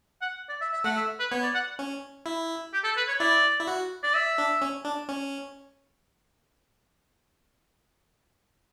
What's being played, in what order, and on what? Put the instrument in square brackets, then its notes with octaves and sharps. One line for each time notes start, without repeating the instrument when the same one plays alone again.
[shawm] F#5
D5
E5
E5
[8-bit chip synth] A3 [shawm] F#5
[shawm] E5
B4
[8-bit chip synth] B3 [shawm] C#5
[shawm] D5
F#5
[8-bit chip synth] C#4
E4
[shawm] G4
A4
B4
C#5
[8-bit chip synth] E4 [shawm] D5
[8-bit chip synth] E4
F#4
[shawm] D5
E5
[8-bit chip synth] D4
C#4
D4
C#4